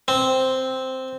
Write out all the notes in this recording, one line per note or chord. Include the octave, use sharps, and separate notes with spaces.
C4